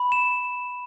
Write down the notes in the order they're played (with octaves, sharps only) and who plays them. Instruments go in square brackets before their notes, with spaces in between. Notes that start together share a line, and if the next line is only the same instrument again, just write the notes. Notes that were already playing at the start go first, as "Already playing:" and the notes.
Already playing: [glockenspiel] B5
E7